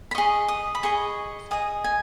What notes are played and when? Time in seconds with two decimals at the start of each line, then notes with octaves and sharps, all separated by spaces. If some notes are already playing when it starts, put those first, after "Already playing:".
0.11 B5
0.15 G#4 D#5 C#6
0.48 D#6
0.75 B5
0.83 G#4 D#5 C#6
1.51 G#4 D#5 D#6
1.84 G#5